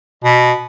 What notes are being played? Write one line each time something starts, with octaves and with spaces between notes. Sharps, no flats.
B2